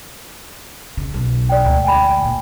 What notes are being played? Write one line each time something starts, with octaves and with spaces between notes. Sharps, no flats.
C#3
B1
D5 G5
D2 G#2
G5 G#5 B5
A#2